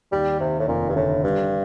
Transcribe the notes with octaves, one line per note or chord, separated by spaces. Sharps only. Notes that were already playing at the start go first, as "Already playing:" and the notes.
D#2 G3
D#2 C3
A2
F1 A#2
G2
A2 D3
G2 G3